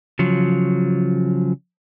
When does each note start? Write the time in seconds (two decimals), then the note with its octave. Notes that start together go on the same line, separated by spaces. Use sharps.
0.19 C#3 F3 F#3